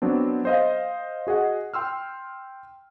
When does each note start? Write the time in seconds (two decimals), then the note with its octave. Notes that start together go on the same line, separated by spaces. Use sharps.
0.02 F#3 B3 C4 D4
0.45 C5 D#5 F5
1.27 F#4 G#4 D#5 F#5
1.74 G5 C6 E6 F6